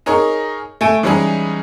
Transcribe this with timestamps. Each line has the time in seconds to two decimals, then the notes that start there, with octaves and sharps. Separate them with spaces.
0.06 D#4 G#4 A#4 C#5
0.81 A3 G#5 D7
1.03 E3 G3 G#3 C#4 D#4 G#4